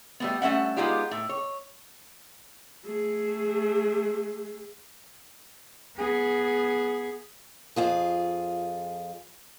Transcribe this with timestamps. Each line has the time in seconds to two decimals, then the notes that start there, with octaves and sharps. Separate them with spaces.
0.20 G3 A3 B3
0.42 G3 A3 C#4 E5 F#5
0.77 G#3 B3 D#4 F4 G4 D5
1.11 A2
1.29 C#5
2.86 A3 G#4
5.97 B3 G#4
7.76 F2 F4 G#4